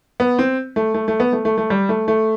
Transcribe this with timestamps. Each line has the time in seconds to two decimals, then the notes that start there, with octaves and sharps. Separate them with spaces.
0.20 B3
0.39 C4
0.76 A3
0.94 A3
1.08 A3
1.20 B3
1.33 A3
1.45 A3
1.58 A3
1.70 G3
1.89 A3
2.08 A3